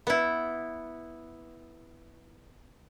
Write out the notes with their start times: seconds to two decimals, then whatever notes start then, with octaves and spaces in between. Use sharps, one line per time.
0.07 B3 E4